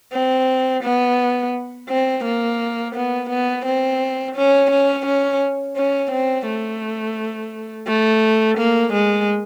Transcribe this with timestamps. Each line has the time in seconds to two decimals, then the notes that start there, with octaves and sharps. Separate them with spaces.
0.13 C4
0.83 B3
1.89 C4
2.24 A#3
2.95 B3
3.30 B3
3.65 C4
4.35 C#4
4.71 C#4
5.06 C#4
5.76 C#4
6.11 C4
6.47 A3
7.87 A3
8.58 A#3
8.93 G#3